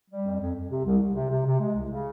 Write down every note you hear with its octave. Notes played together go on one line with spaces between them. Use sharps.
G3
F2
F2
F2
C3
C2
C2
C3
C3
C3
G#3
C2
C#3